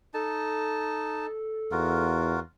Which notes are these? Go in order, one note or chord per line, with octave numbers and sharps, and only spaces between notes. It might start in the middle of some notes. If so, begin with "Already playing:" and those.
D#4 A4 A5
E2 F4 F#4 A#4